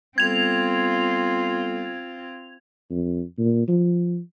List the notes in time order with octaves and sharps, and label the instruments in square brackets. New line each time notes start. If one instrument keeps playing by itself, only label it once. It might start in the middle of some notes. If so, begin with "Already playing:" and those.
[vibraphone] G3 B3 A4 [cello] C4 F4 [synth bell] G#6 F7
[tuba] F2
A#2
F3